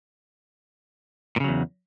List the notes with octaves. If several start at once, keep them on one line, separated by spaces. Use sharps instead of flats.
E2 A#2 C#3 F#3